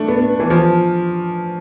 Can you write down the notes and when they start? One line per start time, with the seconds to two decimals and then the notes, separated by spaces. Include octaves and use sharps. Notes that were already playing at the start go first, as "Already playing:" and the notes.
Already playing: A3 D4
0.08 B3
0.19 B3
0.40 E3
0.50 F3